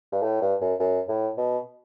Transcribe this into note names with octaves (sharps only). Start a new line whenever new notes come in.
G2
A2
G2
F#2
F#2
A2
B2